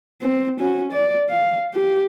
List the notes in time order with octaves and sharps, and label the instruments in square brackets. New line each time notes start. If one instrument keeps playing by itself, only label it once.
[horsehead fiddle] C4
C#4 F#4
D5
F5
G4